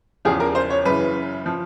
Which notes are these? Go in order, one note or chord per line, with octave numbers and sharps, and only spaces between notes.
E2 C#3 F3 G#4
A#4
C5
C#5
F#2 C#3 E3 B4
F3